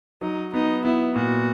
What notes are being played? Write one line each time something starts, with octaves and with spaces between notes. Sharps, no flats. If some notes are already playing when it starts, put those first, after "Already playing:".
F#3 D#4
B3 D#4
B3 E4
A#2 F#4